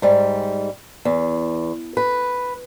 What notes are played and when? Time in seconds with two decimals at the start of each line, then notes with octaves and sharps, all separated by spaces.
0.02 G#2 G3
1.05 E2
1.97 B4